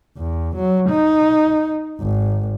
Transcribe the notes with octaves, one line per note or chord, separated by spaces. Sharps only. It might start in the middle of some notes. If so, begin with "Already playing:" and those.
E2
F#3
D#4
G#1